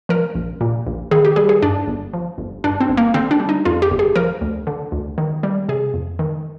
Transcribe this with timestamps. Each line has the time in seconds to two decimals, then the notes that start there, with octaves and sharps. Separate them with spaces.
0.09 F3 A#4
0.35 A#1
0.61 A#2
0.87 A#1
1.11 D#3 G#4
1.25 G4
1.36 G3 G#4
1.49 G#4
1.62 G2 D4
1.87 G1
2.13 F3
2.38 G1
2.64 G2 D4
2.80 C4
2.89 G1
2.97 A#3
3.14 D3 C4
3.31 D4
3.40 G3
3.49 D#4
3.65 F2 F4
3.82 G4
3.91 G1
3.99 G#4
4.16 F3 A#4
4.41 D2
4.67 D3
4.92 D2
5.18 D#3
5.43 G3
5.69 C3 G#4
5.94 F2
6.19 D#3